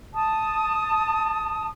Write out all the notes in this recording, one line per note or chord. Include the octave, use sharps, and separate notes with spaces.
A5 D#6